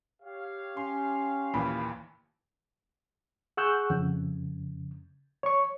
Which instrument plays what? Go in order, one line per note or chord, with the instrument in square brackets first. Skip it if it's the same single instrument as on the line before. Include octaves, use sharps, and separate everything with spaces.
[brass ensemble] G4 C#5 F5
[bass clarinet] C#4 [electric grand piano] C6
[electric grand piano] D#2 A#2 E3 [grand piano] B5
[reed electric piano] G#4 F#5 C#6 E6 F#6 G6
F2 C#3
C#5 C#6